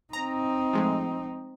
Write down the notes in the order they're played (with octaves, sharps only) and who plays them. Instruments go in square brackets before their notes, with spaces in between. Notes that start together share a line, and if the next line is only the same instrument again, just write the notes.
[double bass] C4 D#4 [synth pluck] A#5
[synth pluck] F3 G#3 A3